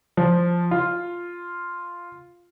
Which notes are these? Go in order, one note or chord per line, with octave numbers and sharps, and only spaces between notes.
F3
F4